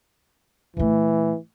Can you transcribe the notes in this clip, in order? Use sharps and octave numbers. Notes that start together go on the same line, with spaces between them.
A#2 E3 A3